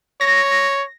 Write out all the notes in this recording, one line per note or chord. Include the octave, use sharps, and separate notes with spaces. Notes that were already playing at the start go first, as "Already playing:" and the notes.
C#5 A#6